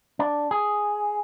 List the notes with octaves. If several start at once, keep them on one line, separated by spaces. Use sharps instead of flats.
D4
G#4